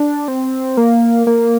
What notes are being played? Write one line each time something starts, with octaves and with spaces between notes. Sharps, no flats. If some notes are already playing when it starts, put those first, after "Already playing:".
Already playing: D4
C4
A#3
A#3